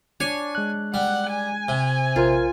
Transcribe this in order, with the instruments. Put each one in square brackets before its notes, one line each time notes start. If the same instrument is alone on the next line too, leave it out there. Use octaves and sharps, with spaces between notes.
[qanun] D4 C#5 [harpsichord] G#5
[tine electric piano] G#3 F#6
[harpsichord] G3 [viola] F#5
[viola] G#5
[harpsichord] C3
[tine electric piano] A#1 A#4 C5 [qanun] F4